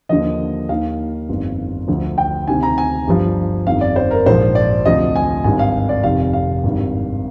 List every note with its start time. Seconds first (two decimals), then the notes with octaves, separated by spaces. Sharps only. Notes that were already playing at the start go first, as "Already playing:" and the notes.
0.09 D#2 D3 F3 D#5
0.69 D#2 D#3 F5
1.29 G1 F2 D#3
1.88 D2 D3 F3
2.18 G5
2.48 D2 C3 D#3 G#5
2.63 A#5
2.78 G#5
3.08 G1 G2 F3
3.67 G1 F2 D#3 F5
3.81 D5
3.96 C5
4.11 A#4
4.26 A#1 G#2 F3 C5
4.55 D5
4.85 D2 C3 F3 D#5
5.16 G#5
5.44 G#1 G2 D#3 G#5
5.59 F5
5.89 D5
6.04 F1 F2 D#3 F5
6.33 F5
6.64 G#1 G2 D#3